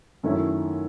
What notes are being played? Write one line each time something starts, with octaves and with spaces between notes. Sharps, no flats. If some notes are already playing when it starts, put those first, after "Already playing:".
F#2 D#3 A3 C#4 E4